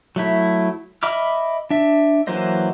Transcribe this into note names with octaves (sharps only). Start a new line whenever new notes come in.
F#3 A3 E4
D#5 E5 B5 D6 F6
D4 E5
E3 F#3 A#3 C5 D#5